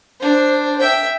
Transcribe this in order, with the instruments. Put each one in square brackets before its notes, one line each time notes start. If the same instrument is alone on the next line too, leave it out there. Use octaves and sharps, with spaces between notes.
[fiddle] D4 C5
E5 G5